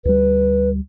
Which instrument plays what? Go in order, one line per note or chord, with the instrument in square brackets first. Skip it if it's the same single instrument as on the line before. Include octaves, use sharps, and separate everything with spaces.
[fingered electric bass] D2 G3 [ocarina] B4